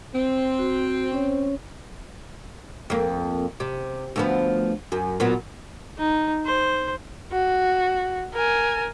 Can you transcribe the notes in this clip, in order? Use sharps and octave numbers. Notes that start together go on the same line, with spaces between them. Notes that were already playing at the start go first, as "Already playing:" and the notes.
C4
F#4
C#4 C#5
F2 A#3
C3
D2 F3 B3
F#2
A#2 F#3 B3
D#4
C5
F#4
A#4 G#5